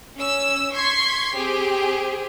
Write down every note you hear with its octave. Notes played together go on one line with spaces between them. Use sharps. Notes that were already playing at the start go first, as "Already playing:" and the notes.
C#4 E6
C6 C#6 G#6 B6 C7
C4 G4 G#4